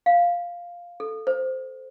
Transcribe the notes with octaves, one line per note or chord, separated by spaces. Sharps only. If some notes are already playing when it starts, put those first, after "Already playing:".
F5
A4
C5